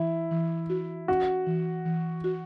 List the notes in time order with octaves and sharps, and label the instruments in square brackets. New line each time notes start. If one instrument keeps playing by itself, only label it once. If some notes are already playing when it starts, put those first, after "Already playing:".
Already playing: [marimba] E3 [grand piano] E4
[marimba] E3
F#4
[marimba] C#4 [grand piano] F#4
[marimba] E3
E3
F#4